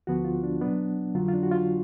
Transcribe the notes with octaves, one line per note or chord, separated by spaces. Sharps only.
D2 D3 F3 B3 F#4
F4
D4
B2 F#3 B3 D4
F2 D3 F#3 F4
F4
D4
F#4
F4